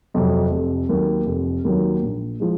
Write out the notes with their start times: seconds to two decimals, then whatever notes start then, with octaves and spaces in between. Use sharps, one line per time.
0.14 F2 C3 F#3
0.51 F1
0.89 D#2 D#3 F#3
1.26 F1
1.65 D#2 D#3 F#3
2.03 A#1
2.40 F3 G#3